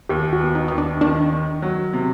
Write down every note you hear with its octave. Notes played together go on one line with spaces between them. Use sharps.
D#2 G4
F#4
B3
D#4
D#2 D#4
D4
D#3 D4
D#3
F#3
C3